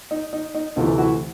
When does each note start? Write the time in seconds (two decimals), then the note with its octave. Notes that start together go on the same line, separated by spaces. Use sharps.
0.11 D#4
0.33 D#4
0.54 D#4
0.76 D2 C3 E3 A3 D#4 F4
0.98 E4 F#4